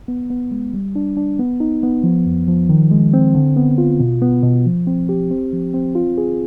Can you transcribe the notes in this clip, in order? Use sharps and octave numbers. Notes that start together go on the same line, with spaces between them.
B3
B3
G#3
G3
D4
D4
B3
D#4
B3
F3
F2
F3
D#3
G#3
C4
D3
B3
F4
B2
B3
B2
F3
C4
G4
C4
F3
C4
F4
G#4